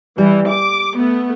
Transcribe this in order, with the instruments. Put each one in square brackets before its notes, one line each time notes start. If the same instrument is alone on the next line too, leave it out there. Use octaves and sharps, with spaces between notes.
[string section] E3 [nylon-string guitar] G3
[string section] D6
A3 B3